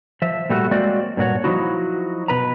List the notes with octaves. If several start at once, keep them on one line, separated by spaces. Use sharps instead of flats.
F3 E5
A#2 G3 A3 F#4
F#3 G#3 A#3 C4 F#4 D5
G2 A#2 F#4 C#5
F3 F#3 G#3 D#4 E4 F#4
B2 B4 A#5